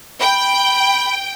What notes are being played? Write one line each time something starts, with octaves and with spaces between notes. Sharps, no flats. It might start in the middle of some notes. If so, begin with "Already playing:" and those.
G5 B5